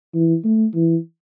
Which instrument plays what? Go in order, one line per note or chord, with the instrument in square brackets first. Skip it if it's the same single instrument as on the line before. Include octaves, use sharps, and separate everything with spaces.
[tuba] E3
A3
E3